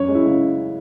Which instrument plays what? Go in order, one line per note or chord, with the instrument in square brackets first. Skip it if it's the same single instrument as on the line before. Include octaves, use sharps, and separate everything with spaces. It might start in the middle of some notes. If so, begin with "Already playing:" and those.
Already playing: [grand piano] F#2 C#5
G#3
E4
C#3